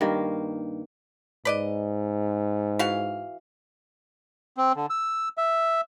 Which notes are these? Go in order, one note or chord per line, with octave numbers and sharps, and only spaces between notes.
G2 D#3 A#3
G#2 B4 D5 D#5
E3 F#4 F5
C4
D3
E6
E5